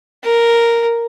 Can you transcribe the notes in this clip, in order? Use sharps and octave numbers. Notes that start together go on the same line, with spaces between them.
A#4